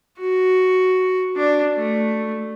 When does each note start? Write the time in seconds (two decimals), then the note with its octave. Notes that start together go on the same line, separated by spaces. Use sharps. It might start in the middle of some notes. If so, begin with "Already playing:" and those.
0.19 F#4
1.37 D4
1.77 A3